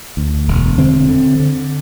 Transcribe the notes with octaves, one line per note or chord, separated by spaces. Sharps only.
D2
E1
D3 C4
D3
D3